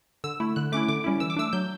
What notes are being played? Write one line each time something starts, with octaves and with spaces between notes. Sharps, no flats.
D3 E6
A3 E4
D3 F#6
A3 C#4 E4 D6
D3 D6
G3 C#4 E4
E3 E6
D6
A3 D4 E6
F#3 G6